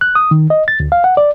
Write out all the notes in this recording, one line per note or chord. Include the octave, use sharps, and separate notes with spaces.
F#6
D#6
D#3
D#5
A6
D2
F5
F#5
D5